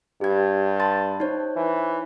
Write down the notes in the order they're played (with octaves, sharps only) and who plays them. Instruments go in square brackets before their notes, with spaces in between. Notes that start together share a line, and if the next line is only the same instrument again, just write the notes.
[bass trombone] G2 [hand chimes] G4 G#6
[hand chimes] A5 C6 A6
D#4 C5 C#5
[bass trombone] E3